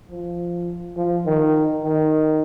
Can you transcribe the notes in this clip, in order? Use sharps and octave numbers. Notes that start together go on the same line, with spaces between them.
F3
F3
D#3
D#3